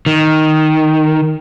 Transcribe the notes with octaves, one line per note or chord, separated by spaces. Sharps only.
D#3